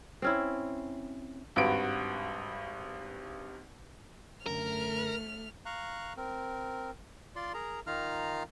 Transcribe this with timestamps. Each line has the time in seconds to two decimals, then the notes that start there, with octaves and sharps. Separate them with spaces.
0.22 C4 C#4 E4
1.56 G#1 G2 F#4 B4 D7
4.46 F#2 D3 A3 A#4 F6
5.66 F5 A#5 C#6 F#6
6.17 C4 A#4
7.36 F4 D5 C6
7.54 G#4 A#4 A#5
7.87 D#3 D#4 F4 F5 A#5 F6